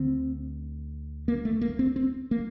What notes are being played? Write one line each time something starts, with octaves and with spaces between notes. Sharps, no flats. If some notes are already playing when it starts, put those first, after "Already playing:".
Already playing: D2 D3 C4
A#3
A3
A#3
C4
C4
A#3